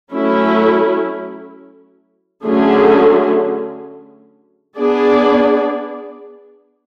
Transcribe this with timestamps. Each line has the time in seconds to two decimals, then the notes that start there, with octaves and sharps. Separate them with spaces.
0.11 F#3 A3 C#4 E4
2.45 D3 F#3 A3 C#4 G#4
4.77 B3 D4 G#4 D5